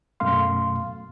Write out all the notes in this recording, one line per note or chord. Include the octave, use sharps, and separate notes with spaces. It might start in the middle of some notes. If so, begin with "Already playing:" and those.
F#2 B2 A3 F5 C6